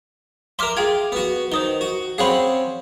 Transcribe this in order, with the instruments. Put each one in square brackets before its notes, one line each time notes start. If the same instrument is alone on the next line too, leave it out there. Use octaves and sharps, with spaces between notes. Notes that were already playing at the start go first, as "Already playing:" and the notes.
[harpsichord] A#4 E5 [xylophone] C6 D6 F6
[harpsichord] F4 [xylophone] G#4 G5 G#6
[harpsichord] B3 F#4
[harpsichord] D#3 [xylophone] C5 D#6 G7
[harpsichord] F#4
[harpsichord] C4 C#4 G#4 [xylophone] F5 F#5 B5